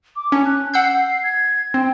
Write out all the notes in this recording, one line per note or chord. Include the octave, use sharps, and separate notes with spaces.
D6
C#4 A5
F#6
F#5 E6 G6 C7
G#6
C4 G5